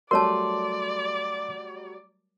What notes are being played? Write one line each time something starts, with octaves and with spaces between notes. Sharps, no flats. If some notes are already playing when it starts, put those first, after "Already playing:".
F#3 G3 A3 A#4 C#5 D5 A5 C6